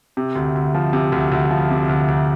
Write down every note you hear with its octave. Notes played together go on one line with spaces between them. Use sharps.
C3
D2
D2
F3
C3
D2
D2
F3
C3
D2
D2